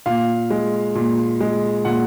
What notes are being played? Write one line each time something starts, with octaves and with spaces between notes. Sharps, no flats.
A#2 F5
G#3
A#2
G#3
A#2 F#5